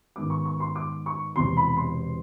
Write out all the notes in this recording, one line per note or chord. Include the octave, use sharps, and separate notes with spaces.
G#2 D#3 G#3 B3 D6
C#6
C#6
C6
D6
C#6
E1 E2 C3 C6
B5
C6